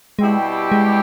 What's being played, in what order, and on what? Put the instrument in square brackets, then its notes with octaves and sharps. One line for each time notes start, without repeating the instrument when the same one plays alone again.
[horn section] B2 G3 C4 E4 G4 [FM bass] G#3
[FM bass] G#3